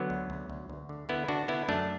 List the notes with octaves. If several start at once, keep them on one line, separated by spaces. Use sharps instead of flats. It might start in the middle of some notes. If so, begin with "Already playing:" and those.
Already playing: D3 F#3 B3
D2
D2
D2
D2
D3
D3 B3 E4
D3 D4 F#4
D3 B3 E4
F#2 A3 D4